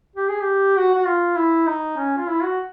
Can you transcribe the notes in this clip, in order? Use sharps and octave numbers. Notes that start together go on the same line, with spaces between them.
G4
G#4
G4
F#4
F#4
F4
E4
D#4
C#4
F4
E4
F#4